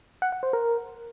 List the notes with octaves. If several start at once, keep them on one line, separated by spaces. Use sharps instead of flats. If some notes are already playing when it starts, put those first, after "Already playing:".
F#5
F#5
C5
A#4